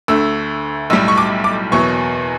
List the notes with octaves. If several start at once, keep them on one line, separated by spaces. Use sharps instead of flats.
D2 D3 A3 E6
B1 A2 G3 E6
C#6
D6
D6
F#1 E2 B2 F#3 C#6